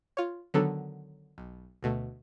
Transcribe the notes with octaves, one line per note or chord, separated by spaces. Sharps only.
F4 C#5
D3 D#3 F#3 B3 D4 A4
B1
D2 B2 A3